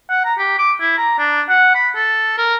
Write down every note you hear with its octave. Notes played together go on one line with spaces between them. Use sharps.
F#5
A#5
G4
D6
E4
A#5
D4
F#5
B5
A4
A#4